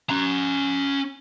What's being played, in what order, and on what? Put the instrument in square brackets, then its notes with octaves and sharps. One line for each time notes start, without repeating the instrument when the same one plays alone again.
[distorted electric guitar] C#4 A#5